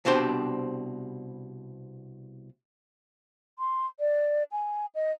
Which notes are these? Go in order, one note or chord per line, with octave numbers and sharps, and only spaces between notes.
C2 B2 C4 D4 G4 C5
C6
D5
G#5
D#5